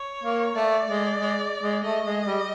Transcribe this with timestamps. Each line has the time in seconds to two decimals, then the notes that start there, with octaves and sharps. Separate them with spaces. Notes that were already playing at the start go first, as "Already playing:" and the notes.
Already playing: C#5
0.23 A#3
0.55 A3 D5
0.88 G#3
1.19 G#3
1.63 G#3
1.84 A3 D#5
2.06 G#3
2.26 G3